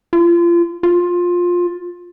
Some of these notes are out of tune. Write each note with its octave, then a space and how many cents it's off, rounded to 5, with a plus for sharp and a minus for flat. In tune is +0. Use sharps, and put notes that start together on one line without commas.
F4 -30
F4 +15